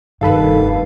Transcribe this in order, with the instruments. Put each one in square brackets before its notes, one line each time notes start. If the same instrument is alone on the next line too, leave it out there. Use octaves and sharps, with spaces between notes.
[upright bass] F1 D3 [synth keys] G2 A4 B4 [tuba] D#3 [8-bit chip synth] F5